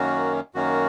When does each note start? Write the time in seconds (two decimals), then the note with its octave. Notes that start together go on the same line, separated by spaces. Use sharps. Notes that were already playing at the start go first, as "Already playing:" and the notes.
Already playing: F#2 D#3 A#3 C#4 F#4
0.55 F#2 D#3 A#3 C#4 F#4